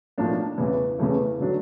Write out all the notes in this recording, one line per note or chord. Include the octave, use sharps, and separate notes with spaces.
B1 A2 F3 A#3 D4
E2 C#3 E3
E2 C#3 E3 A3
D3 F#3 A3 D4